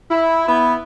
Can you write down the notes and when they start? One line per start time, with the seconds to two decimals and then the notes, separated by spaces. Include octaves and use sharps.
0.11 E4
0.47 B3 E4